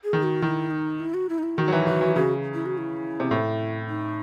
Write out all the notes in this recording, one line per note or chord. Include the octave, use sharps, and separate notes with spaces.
G#4
D#3
F#4
D#3 E4
D#4
E4
F#4
E4
D#4
E4
D#3 F#4
F#3
E3
E3 F#4
E3
C#3 F#4
E4
F#4
E4
C3
A2
D#4